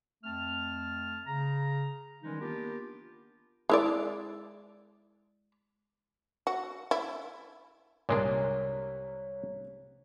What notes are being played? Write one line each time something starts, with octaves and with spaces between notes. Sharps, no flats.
F2 A3 C4 A5 F6
C#3 A#5
D#3 E3 G3 G#3 C#4 D#4
A#3 B3 D4 F4 G4 A#4
G#3 E4 D5
F#4
E4
C2 A#2 G#3 D4 A#4 C#5